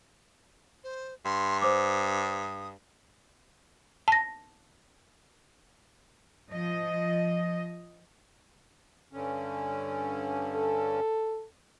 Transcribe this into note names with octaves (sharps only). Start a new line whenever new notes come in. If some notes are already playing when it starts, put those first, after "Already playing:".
C5
G2 C6
C5 D6 D#6
A5 A#6
F3 D#5
G2 D3 C#4
A4